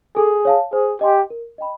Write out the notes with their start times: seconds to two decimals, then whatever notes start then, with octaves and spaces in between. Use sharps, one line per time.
0.16 G#4 A4
0.45 C#5 F5 A5
0.73 G#4 C5
1.01 G4 D#5 G#5 C6
1.30 A#4
1.58 D#5 G5 B5